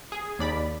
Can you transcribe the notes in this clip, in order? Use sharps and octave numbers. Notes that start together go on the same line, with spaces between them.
G#4
D#2 D5 B5